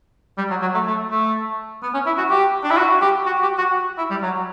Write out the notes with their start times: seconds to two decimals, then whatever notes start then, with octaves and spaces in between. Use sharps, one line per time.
0.38 G3
0.50 F#3
0.62 F#3
0.74 A3
0.87 A3
1.11 A3
1.83 B3
1.94 C#4
2.06 E4
2.18 F#4
2.30 G4
2.64 D4
2.71 E4
2.78 F#4
3.02 G4
3.26 F#4
3.42 G4
3.58 F#4
3.98 E4
4.10 G3
4.22 F#3